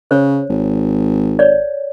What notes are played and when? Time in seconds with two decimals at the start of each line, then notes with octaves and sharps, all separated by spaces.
0.11 C#3 C5 C#5
0.49 G#1
1.39 C#5 D5